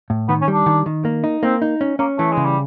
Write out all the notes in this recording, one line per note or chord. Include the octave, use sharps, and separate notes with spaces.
A2
D#3 B3
C#4
G3
D4
D#3
D#3
A#3
D#4
A#3 C4
D#4
C#4
A#3 C#4
E3 A3
C#3 G#3
G3